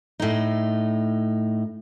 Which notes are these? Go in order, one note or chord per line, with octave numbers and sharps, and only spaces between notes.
A2 D#4